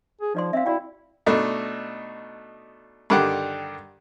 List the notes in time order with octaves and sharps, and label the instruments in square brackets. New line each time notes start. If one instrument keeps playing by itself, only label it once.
[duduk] G#4
[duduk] F3 [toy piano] D#4 D5 C6
[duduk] C4 [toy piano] E5 F5
[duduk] E4 [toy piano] F#4 D5 G5
[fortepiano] B2 A3 D4 D#4
G2 D3 D#3 G4 F#5